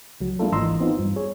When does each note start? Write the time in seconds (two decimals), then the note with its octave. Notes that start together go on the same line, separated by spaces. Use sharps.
0.21 C#2 F#3
0.39 G#3 A#3 D4 E4 F4 A4
0.52 G#1 E3 D#5 A#5 C6 E6
0.80 B3 C4 D#4 F4
0.99 G2
1.16 G#4 C#5